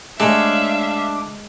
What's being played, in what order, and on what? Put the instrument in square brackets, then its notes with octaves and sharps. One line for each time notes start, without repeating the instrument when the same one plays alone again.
[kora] G#3 C#5 [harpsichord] A3 [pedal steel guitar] D4 [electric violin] E5 F5